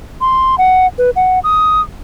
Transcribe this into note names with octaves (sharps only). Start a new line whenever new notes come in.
C6
F#5
B4
F#5
D#6